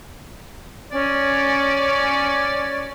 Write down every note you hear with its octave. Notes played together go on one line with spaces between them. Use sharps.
C#4 D5